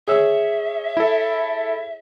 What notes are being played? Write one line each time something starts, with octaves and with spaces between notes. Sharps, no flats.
G#4 C#5 E5 E6
E4 A4